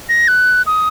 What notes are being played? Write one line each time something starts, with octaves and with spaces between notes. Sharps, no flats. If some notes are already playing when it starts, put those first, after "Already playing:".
A#6
F#6
D#6